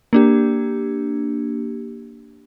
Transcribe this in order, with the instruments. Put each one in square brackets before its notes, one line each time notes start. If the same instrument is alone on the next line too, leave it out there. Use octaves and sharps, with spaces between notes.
[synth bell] A#3 D4 G4